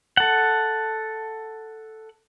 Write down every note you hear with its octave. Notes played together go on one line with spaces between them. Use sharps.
A4 F#5